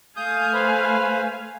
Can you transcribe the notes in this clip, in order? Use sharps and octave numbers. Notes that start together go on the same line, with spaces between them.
A3 F5 G#5 D#6 G6
B4 C5 B5